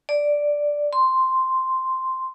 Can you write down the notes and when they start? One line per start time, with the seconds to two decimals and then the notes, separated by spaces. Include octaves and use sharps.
0.09 D5
0.93 C6